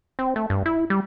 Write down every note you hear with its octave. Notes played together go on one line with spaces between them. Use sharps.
C4
A3
G2
E4
G3